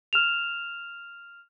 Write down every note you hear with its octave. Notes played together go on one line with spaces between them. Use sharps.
F6 E7 F7